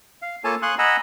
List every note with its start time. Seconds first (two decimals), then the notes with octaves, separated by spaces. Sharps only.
0.22 F5
0.44 A#3 F4 A4 C#5 G#5 A5
0.62 F5 G#5 C6 C#6 D#6 F#6
0.78 D#5 F#5 G#5 A#5 B5 E6